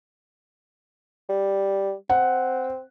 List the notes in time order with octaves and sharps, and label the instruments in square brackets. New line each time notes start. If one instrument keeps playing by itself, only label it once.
[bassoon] G3
[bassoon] C4 [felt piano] F#5